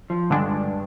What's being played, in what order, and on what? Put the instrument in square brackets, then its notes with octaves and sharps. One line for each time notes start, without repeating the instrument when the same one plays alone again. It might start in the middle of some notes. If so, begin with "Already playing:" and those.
[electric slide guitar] F3
[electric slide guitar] G2 [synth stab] D3 G#3 D4